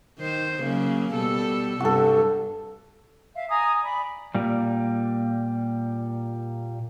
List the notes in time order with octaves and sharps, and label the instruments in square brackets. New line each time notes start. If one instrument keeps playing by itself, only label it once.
[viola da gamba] D#3 C5
C#3 F#3 A#3
B2 G3 A4
[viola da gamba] G2 C3 [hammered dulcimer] F#4 A4
[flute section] E5 F5
G#5 A#5 D#6
D5 B5
[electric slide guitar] A#2 G3